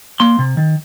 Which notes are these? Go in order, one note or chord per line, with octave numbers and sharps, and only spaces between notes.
A#3 C6
C3
D#3